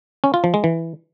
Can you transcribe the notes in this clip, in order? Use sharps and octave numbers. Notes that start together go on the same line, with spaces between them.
C#4
F4
F3
G#3
E3